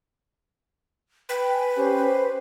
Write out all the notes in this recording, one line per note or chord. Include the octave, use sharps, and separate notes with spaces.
B4 G5
G#5
C#4 G4 C5
C5